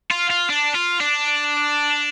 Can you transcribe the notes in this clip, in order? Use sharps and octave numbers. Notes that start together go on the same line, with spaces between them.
F4
F4
D4
F4
D4